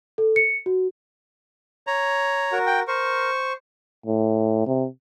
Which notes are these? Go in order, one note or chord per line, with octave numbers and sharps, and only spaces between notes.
A4
C#7
F#4
C#5 A#5
F#4 A#4
G5
A#4 C5 C#6
A2
C3